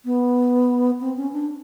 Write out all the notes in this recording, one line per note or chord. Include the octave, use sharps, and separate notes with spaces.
B3
C4
C#4
D4